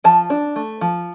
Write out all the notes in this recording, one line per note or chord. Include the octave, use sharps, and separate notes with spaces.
F3 A5
D4
A3
F3